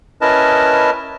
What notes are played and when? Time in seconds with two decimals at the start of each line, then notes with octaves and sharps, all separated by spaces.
0.21 C#4 E4 A#4 B4 D#5 A5